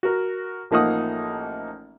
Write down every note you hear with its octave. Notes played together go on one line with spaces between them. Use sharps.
F#4 A#4
A1 F3 A#3 D#4 F#5 D#6